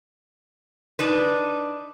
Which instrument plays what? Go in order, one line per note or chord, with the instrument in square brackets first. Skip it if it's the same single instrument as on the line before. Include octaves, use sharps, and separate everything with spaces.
[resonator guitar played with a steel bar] D4 D#4 B4